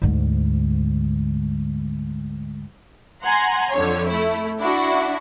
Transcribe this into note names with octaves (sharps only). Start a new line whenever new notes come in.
D2 G#2
F#5 G#5 A#5 C6
F2 D3 C#5
A3 E4
D4 E4 F#4